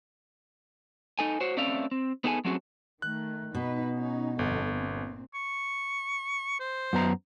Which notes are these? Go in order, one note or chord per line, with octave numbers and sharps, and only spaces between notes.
D#4 A4 G#5
F#4 C5 C#5
A3 C4 C#4 D5 E5 F5
C4
B3 D#4 G#4 A4 E5 G#5
F#3 A3 C4 C#4 F#4 G#4
D#3 A3 F#6
B2 D#4 B4
C#4 D#4
G1 F2 A4
A#2 C4
C#6
C5
F#2 B3 A#5